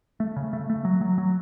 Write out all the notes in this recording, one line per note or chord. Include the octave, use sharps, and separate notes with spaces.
A3
C#3
A3
A3
F#3
F#3
F#3